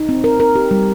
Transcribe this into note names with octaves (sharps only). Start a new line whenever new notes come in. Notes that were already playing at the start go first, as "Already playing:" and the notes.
Already playing: D#4
C4
A#4
A#4
G4
G3